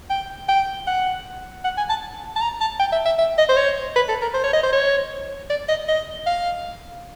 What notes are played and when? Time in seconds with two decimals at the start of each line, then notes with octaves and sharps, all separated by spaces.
0.10 G5
0.48 G5
0.87 F#5
1.64 F#5
1.77 G#5
1.89 A5
2.36 A5
2.41 A#5
2.60 A5
2.79 G5
2.92 E5
3.05 E5
3.18 E5
3.38 D#5
3.49 C5
3.57 C#5
3.96 B4
4.08 A4
4.21 A#4
4.34 C5
4.44 C#5
4.53 D#5
4.63 C5
4.72 C#5
5.50 D5
5.68 D#5
5.88 D#5
6.26 F5